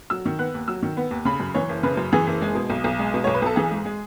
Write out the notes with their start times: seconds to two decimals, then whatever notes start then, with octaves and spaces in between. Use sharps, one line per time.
0.10 F#3 E6
0.26 D#3
0.39 B3 F#6
0.54 D#2
0.68 F#3 E6
0.83 D#3
0.97 B3
1.11 D#2
1.25 C#3 B5
1.40 F#2
1.55 E3 C#5
1.69 F#1
1.83 C#3 B4
1.97 F#2
2.13 E3 G#4
2.27 F#1
2.42 G#3
2.55 B2
2.70 B1
2.84 B1
2.99 G#3
3.14 B2
3.24 B1 C#5
3.34 B4
3.42 B1 A4
3.56 E3 G#4
3.71 G#2
3.85 G#3